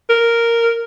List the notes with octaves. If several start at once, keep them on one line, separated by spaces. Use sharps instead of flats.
A#4